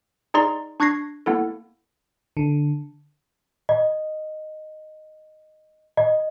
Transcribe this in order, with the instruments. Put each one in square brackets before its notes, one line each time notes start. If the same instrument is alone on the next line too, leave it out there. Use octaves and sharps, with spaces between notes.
[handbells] D#4 G#4 D5 A#5 C6
D4 C#6 F#6 G#6 A#6 C7
A#3 B3 E4 A4
[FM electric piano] D3
[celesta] D#5
D#5